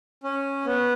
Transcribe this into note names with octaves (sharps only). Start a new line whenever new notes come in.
C#4
B3